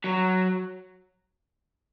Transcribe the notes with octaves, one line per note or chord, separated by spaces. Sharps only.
F#3